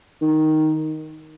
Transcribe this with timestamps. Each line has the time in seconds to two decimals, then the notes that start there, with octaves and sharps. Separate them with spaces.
0.22 D#3